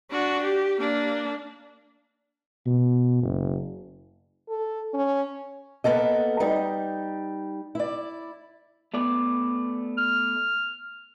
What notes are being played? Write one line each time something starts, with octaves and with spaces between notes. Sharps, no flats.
D4 F#4
G4
A#3 D4
B2
F#1
A4
C#4
A#3 B3 A4 D#5
G3 D#4
E4 D5
A3 B3 D5
F6